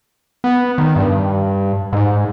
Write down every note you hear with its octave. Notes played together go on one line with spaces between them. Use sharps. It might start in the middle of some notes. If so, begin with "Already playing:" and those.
B3
D#3
G2
G#2